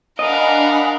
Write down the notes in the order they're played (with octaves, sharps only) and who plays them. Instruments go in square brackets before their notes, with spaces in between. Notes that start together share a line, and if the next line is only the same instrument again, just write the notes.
[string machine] D4 F#5 B5 [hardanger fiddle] A#4 F5 [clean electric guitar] D#5 [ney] G#5